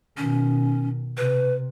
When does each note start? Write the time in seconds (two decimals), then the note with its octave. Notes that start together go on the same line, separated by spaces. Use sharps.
0.17 B2 D#3 C#4
1.17 C3 B4